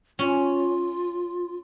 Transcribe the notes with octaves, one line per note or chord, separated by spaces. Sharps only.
C#4 F4